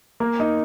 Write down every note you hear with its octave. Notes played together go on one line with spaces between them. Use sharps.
A#3
D#4